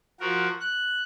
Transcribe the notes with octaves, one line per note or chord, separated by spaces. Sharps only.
F3 F#4 A#4
F#6